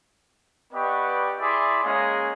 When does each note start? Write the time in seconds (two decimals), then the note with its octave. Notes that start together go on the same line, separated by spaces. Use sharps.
0.73 B3 G4 B4 D5 D#5 C#6
1.39 E4 G#4 D5 E5 C6 D6
1.84 G#3 A#3 C#4 G#4 D#5